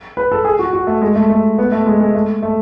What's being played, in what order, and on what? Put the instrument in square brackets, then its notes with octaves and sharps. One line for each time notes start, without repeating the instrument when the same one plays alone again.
[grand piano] B4
A4
G#4
F#4
F#4
A3
G#3
A3
A3
B3
A3
G#3
G#3
A3
A3